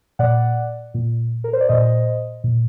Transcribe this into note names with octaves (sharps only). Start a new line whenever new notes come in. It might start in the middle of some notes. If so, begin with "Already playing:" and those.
A#2 D5 F#5
A#2
A#4
C5
D5
A#2 C5 D#5
A#2